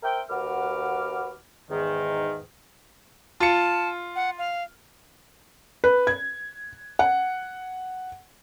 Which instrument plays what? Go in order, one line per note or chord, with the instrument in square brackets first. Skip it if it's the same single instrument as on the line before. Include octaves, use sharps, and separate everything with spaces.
[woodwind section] A#4 C5 E5 G5
D#2 F#4 B4 F#5 D6 F6
E2 G#2 D#3
[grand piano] F4 C#7 [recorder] A5
[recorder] F#5
F5
[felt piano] B4
G#6
F#5